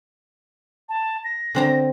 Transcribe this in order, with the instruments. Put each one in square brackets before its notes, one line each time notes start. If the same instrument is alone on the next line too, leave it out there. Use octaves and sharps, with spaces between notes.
[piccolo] A5
A#6
[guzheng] D3 C4 A#5